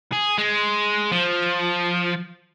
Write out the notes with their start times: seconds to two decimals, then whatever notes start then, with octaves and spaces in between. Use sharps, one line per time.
0.13 G#4
0.38 G#3
1.12 F3